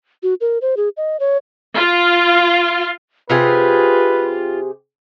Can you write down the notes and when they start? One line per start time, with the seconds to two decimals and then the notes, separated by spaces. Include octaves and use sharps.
0.23 F#4
0.41 A#4
0.62 C5
0.77 G#4
0.97 D#5
1.20 C#5
1.74 F4
3.30 C3 F4 G4 G#4 B4